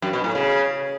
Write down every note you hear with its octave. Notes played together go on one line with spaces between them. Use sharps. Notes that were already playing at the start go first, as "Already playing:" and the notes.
F#2
B2
A2
C#3